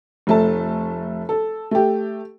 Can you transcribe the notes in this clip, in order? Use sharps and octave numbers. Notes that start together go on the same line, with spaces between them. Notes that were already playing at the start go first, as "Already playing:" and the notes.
F1 A3 A5
A4
A3 G4